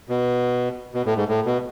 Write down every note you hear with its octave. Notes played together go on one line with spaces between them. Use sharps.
B2
B2
A2
G#2
A2
B2